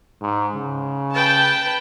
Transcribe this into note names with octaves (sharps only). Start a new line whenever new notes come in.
G#2
C#3
B4 G5 A5